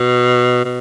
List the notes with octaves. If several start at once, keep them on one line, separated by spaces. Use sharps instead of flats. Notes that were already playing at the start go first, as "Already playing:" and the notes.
Already playing: B2
B2